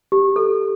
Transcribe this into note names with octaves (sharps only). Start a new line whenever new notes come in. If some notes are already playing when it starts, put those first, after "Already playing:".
G4
A4